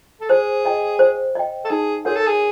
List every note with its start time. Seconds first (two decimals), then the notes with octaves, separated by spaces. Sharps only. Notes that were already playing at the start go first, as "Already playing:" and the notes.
0.21 A4
0.30 G#4 C5
0.65 D#5 G5
0.99 C5
1.35 D#5 G5
1.65 A4
1.70 D#4 G#4
2.05 F#4 G#4 A#4 C#5 F#5
2.16 A4
2.27 G#4